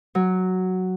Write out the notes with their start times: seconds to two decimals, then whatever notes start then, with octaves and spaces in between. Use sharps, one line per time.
0.15 F#3